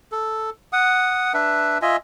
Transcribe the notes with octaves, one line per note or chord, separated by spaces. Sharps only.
A4
F#5 D#6
D4 B4 E5
F4 D#5 E5 G#5